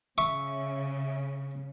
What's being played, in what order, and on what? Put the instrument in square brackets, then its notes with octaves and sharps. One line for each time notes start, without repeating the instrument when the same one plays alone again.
[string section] C#3 [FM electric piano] E5 [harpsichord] C#6